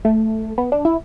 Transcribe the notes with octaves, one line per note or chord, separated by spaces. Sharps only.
A3
B3
D4
E4